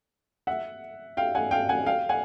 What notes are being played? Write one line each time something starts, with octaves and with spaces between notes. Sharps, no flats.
E5 F#5
F5 G5
F#5 G#5
F5 G5
F#5 G#5
F5 G5
F#5 G#5